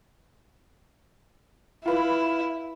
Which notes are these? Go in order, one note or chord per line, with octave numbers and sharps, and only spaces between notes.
E4 F4 B4